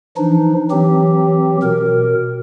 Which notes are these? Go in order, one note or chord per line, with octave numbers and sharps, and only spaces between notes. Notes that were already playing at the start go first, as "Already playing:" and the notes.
E3 F3 D4 D#4
E3 F#3 C4 G4
B2 A#4